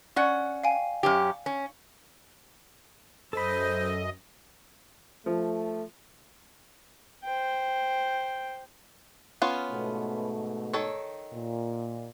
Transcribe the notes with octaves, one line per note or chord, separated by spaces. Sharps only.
C#4 D5 F#5 C#6
F5 G5 G#5
F#2 C#4 G4
C#4
F#2 A4 C5 D#5 B5
F3 A3
C5 G5
B3 C#4 F4
G#2 B2 A3
D#3 A4 C#5
A#2